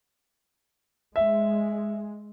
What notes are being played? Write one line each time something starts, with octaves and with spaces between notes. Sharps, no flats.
G#3 E5